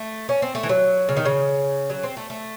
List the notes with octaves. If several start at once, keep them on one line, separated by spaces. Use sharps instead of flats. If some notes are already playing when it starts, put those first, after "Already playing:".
Already playing: A3
C#4
C4
A3
E3
F#3
C#3
D#3
C#3
F#3
C4
A3
A3